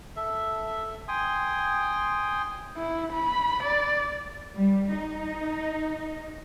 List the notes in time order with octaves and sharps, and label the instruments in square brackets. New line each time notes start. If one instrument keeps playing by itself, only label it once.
[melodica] A4 E5
G5 G#5 C6 D#6
[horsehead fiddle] E4
B5
D5
[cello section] G3
D#4